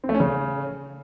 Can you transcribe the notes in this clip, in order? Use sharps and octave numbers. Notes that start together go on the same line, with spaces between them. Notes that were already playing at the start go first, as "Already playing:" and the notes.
C4
A3
C#4
C#3